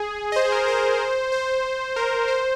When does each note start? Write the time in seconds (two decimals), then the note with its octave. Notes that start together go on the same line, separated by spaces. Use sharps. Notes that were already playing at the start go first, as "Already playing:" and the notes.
Already playing: G#4
0.32 D#5
0.36 C5
0.45 G#4
0.52 A#4
0.68 C5
1.32 C5
1.96 A#4
2.28 C5